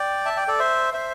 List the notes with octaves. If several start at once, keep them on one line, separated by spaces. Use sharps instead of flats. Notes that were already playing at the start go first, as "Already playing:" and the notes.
Already playing: D5 G5
E5 A5
D5 G5
A4 D5
C5 E5
C5 E5